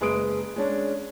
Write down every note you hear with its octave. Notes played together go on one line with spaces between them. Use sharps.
F#1 G#3 B4 D#6 D7
G#3 C#4 D4